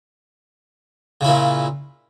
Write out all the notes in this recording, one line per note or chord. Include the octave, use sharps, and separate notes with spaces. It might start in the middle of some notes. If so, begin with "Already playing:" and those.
A#2 C#3 E4